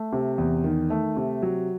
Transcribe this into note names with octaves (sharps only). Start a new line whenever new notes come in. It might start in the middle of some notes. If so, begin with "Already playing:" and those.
Already playing: A3
C3
E2
D#3
A3
C3
F#3